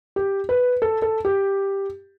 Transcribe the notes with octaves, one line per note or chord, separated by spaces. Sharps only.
G4
B4
A4
A4
G4